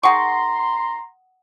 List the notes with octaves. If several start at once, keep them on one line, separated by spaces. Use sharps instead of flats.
D#3 G#4 F#5 G#5 A#5 C6 C#6 D#6